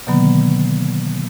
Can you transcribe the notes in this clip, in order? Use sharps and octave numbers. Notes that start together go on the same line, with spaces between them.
B2 D3 D#3 F#3 A#3 B3